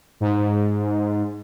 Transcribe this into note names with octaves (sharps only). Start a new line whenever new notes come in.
G#2